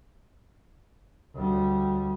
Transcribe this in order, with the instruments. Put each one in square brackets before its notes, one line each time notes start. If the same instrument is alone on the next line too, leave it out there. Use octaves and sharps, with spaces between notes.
[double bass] D2 G3